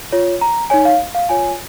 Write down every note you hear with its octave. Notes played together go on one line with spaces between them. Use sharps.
F4 C#5
A#5
D#4 C#5 G#5
F5
F5
F4 C#5 G#5